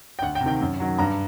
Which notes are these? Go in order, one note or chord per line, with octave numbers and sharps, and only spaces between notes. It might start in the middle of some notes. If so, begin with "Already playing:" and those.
G5
D2 F#5
G5
C3
D#3 G5
F#2
D#3 F#3
G2 A#5